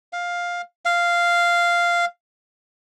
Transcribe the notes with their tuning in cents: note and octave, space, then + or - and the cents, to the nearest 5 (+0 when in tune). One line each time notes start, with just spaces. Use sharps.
F5 +10
F5 -5